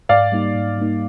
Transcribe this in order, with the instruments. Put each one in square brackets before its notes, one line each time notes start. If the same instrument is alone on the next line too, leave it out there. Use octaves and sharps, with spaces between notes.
[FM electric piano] G#2 [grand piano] D5 F5
[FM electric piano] G3 A#3 D#4
G#2
G3 A#3 D#4